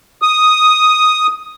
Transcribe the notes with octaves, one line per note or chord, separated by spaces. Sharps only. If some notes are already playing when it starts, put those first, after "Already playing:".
D#6